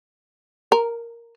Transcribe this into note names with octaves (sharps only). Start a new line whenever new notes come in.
A#4